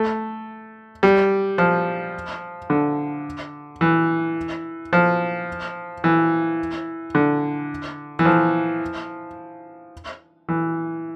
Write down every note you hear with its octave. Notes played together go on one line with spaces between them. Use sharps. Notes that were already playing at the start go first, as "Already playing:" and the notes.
Already playing: A3
G3
F3
D3
E3
F3
E3
D3
E3
F3
E3